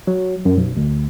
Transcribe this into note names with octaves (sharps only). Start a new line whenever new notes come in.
F#3
F#2
B1
D2